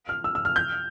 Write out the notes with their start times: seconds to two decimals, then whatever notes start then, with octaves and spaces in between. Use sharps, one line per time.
0.09 F6
0.24 E6
0.35 E6
0.45 F6
0.56 G6